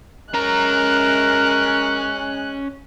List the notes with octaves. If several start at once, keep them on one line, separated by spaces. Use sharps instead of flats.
G#3 C#4 A#4 A#5 F#6